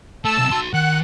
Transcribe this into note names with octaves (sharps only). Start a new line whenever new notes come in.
A3 A5 E6
B1 C3
F#4 C6
D#3 F#5 F#6